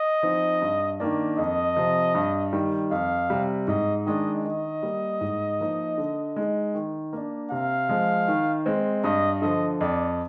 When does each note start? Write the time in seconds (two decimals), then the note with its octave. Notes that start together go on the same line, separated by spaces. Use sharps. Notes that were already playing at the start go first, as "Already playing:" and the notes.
Already playing: D#5
0.23 F3 C4 D#4
0.62 G2
1.00 D#3 A#3 D4
1.38 F2 D#5
1.76 C3 F3
2.15 G2
2.53 D#3 G3
2.91 F2 F5
3.30 C3 G3
3.68 G#2 D#5
4.06 D#3 G#3 D4 D#5
4.44 D#3 D#5
4.83 G3 A#3
5.21 G#2
5.60 F3 A#3 D#4
5.98 D3
6.36 G#3 D#4
6.74 D#3
7.13 A#3 D4
7.51 C3 F5
7.89 F3 G#3
8.28 D#3
8.66 G#3 C4
9.04 G2 D#5
9.42 D3 F3 D#5
9.81 F2 D5